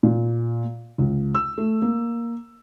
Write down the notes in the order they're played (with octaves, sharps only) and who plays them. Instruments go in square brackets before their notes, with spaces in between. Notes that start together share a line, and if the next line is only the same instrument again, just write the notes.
[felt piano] A#2
C#2
E6
A3
A#3